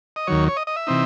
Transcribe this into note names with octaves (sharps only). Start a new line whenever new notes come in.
D#5
D#2 D#3 F#3 C#5
C#5
D#5
D#5
E5
C3 E3 C4 D#4